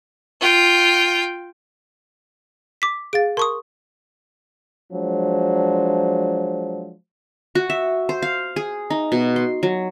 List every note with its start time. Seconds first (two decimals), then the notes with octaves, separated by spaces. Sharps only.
0.41 F4 G5
2.82 D6 B6
3.13 G#4 F5 A6 D7
3.37 A#4 A5 C6 C#6 D#6
4.92 F3 F#3 G#3 D4 C5
7.55 F#4
7.70 E5
8.09 C5
8.22 F5
8.56 G#4
8.90 D#4
9.12 B2
9.36 C6
9.63 F#3